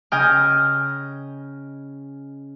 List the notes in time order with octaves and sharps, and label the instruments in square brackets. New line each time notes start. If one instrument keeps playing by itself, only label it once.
[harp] C#3 D#5 G5 G#5 D#6 F6